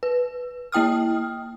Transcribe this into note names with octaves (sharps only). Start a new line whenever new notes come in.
B4
A#3 E4 G5 D#6 F6